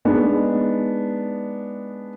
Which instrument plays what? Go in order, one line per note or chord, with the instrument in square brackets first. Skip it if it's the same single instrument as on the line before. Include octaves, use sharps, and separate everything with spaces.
[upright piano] G#3 B3 D4 D#4